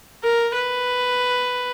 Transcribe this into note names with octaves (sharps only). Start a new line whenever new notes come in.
A#4
B4